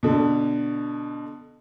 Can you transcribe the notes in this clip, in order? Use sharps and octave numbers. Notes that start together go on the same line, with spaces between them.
B2 D3